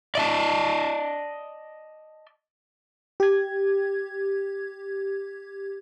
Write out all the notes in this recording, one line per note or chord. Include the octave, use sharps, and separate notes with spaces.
D5 D#5 A5
G4 G#6